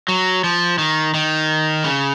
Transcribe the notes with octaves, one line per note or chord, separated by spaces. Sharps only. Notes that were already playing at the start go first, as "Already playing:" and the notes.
F#3
F3
D#3
D#3
C#3